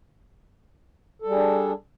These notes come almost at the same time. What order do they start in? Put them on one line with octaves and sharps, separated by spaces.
A4 G3 G#4 D4